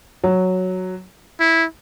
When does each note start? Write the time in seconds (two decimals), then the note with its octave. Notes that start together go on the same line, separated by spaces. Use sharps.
0.24 F#3
1.40 E4